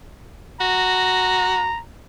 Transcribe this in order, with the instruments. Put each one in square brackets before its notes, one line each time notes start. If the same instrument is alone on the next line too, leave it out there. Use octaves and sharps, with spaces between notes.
[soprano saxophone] F#4 [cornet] A#5